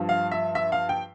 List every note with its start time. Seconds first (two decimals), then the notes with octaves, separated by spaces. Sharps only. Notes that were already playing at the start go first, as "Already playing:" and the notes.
Already playing: G2 F3
0.09 F5
0.32 E5
0.55 E5
0.72 F5
0.89 G5